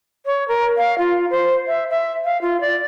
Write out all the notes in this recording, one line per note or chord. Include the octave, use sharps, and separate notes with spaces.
C#5
A#4
F5
F4
C5
E5
E5
F5
F4
D5